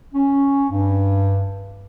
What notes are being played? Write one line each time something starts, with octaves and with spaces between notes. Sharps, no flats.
C#4
G2